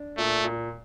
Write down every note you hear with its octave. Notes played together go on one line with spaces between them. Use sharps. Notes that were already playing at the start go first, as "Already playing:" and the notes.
Already playing: D4
A#2 A3
A#2